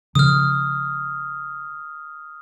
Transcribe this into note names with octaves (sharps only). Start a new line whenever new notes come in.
C#3 F3 D#6 F6